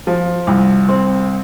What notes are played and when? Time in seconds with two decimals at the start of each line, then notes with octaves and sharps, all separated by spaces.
0.07 F3
0.47 C2
0.89 C4